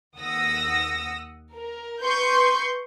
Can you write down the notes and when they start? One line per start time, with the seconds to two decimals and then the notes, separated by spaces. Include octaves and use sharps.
0.17 D#2 F#5 D#6 E6 A#6
1.54 A#4
2.02 B4 C6 C#6 G6